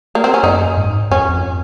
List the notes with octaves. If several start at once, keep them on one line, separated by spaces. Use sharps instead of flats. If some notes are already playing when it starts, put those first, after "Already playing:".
A#3
C4
C#4
F#2 D#4
G#2
F2 C#4
F2